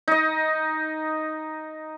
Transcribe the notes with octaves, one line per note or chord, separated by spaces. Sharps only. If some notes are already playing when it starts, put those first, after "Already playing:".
D#4 D#5